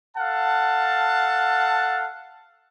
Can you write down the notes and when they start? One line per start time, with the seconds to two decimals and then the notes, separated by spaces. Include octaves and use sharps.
0.17 A4 F5 F#5 A5